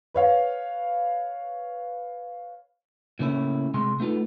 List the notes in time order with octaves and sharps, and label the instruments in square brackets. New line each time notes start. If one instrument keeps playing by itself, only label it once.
[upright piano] B4 C#5 F5
[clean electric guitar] A2 C#3 A#3 C#4 E4
C3 G#3 C6
A3 B3 D#4 F4 A4